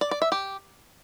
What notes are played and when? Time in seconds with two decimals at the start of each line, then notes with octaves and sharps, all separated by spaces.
0.01 D5
0.11 D5
0.22 E5
0.32 G4